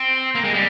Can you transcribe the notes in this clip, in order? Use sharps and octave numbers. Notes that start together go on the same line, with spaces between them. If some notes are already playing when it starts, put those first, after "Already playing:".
Already playing: C4
A#3
G#3
G3